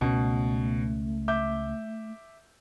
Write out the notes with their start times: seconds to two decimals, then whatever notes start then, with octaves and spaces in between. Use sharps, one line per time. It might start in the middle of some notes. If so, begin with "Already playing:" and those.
0.01 C#2 B2 A3 C#4
1.28 E5 D6 G6